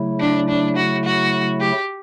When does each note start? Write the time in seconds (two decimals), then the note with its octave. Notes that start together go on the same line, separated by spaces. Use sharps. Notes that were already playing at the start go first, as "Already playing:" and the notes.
Already playing: C#3 F#3 A3 E4
0.20 D4
0.49 D4
0.76 F#4
1.05 F#4
1.60 G4